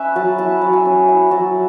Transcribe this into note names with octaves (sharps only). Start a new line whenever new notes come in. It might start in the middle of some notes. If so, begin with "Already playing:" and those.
Already playing: C#4 B4 E5
F#3 A5
E4 A5
F#3
G#5
C#4
E4
F#3 A5